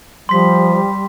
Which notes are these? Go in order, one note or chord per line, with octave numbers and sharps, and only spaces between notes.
F3 G3 C6 B6